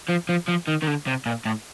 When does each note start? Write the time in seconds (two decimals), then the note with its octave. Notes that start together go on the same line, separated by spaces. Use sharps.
0.09 F3
0.29 F3
0.48 F3
0.67 D#3
0.82 D#3
0.87 D3
1.07 C3
1.26 A#2
1.45 A2